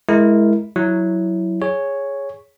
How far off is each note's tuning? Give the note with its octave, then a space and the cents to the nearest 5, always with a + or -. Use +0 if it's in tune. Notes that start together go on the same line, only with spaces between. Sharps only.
G#3 +20 E4 +0 A#4 +0
F#3 +0 E4 +0
G#4 -5 C#5 +0